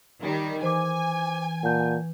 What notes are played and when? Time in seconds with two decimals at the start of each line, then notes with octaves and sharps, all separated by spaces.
0.20 D#3 G3
0.63 E3 C5 G#5 D6
1.63 A#2 F#5 A5 G6